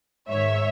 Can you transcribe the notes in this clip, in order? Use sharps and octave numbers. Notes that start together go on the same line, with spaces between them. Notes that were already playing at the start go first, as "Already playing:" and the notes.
G#2 D#3 C#5 E5